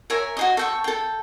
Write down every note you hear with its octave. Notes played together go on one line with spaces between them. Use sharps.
A#4 C#5 E5 G#5
F#4 G#4 D#5
A4 G5 C#6
A4 G5